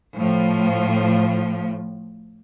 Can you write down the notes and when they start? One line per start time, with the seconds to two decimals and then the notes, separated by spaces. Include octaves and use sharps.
0.16 A2 F3